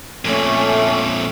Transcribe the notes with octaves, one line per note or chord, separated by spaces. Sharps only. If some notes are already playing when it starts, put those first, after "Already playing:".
F2 A#2 A3 C#4